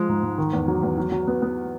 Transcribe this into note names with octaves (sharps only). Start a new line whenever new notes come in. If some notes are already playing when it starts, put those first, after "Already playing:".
Already playing: F3 G#3
G#2
G#2
D#3
E2
F#3
E2
F#3
F#3
B3
B3